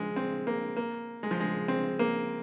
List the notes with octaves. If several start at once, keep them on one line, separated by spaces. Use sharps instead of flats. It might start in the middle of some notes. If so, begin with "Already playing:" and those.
Already playing: F3 G#3
C4
A#3
A#3
G#3
F3
G#3
C4
A#3